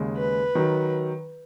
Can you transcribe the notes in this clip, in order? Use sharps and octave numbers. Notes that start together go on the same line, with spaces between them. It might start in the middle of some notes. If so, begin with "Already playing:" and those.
Already playing: D#2 C#3 G#3
B4
D#3 F#3